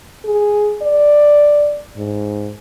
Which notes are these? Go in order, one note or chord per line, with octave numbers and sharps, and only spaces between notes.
G#4
D5
G#2